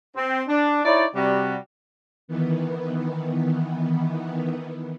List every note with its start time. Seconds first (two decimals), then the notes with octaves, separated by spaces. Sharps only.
0.17 C4
0.48 D4
0.85 D#4 E4 C#5 D5
1.15 C3 G3 F#4
2.28 D#3 E3 B3